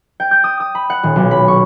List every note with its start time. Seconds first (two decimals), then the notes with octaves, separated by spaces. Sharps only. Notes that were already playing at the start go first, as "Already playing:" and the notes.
0.20 G5
0.31 G6
0.44 D#6
0.60 D#6
0.75 B5
0.90 F#5
1.03 D#1
1.16 B1
1.31 B5
1.48 C#6